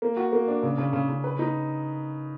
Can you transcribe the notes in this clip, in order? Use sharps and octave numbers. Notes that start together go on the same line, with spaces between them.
A#3
F#4
A#3
D4
C#3
C#3
C#3
C#3
B4
D#4